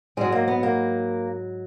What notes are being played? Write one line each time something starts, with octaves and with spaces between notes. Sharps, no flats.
G#2 F#3 G#3
A#3
B3
A#3